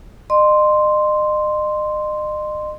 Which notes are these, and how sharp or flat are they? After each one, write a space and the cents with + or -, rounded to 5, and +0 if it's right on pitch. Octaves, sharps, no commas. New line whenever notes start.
D#5 -40 C6 +0